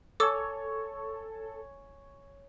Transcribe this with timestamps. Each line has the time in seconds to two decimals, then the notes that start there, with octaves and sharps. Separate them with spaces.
0.20 A4 C#5 G#5 D6 E6